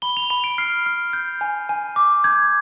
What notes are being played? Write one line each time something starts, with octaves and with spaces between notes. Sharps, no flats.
B5 G7
F7
B5 F7
D7
F6 C7
F6
G6
G#5
G#5
D6
G6 G#6